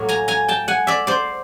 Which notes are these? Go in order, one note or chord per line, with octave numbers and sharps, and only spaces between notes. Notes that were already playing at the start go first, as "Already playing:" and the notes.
Already playing: A2 F#3 A#3
G#5 A#5
G#5 A#5
G5 A5
F#5 G#5
D5 E5
C5 D5